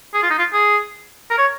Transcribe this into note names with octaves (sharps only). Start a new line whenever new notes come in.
G#4
F4
D#4
F4
G#4
A#4
C#5